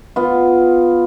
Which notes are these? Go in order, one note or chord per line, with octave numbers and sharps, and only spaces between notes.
B3 F4